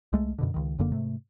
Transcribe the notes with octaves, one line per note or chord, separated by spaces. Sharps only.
C2 G#3 A3
F#2 B2 D3
C#2 D#3
F#1 F#2 D3 A#3
G#2 C3 A3